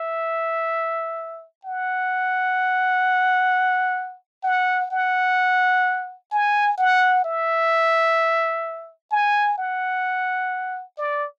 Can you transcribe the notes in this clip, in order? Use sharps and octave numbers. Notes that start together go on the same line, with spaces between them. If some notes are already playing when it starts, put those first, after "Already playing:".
Already playing: E5
F#5
F#5
F#5
G#5
F#5
E5
G#5
F#5
D5